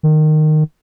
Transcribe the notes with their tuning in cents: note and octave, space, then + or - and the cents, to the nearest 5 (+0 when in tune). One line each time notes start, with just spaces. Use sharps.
D#3 -15